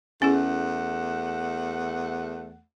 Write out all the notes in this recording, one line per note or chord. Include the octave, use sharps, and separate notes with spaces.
E2 A3 C#4 E4 G#4 F#5